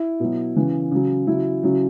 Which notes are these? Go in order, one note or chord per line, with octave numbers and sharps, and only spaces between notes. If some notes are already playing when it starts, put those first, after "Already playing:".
Already playing: E4
B2 F#3
C#3 E3
C#3 F#3
C#3 F#3 E4
C#3 F#3